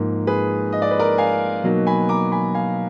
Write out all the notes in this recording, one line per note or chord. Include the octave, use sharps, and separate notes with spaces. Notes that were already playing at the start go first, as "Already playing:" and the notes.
Already playing: G#2 F3 A#3
G#4 B4
D#5
D5
B4
A#4 D5
F5 G#5
B2 F#3 A#3 D#4
G#5 B5
A#5 D6
G#5 B5
F5 G#5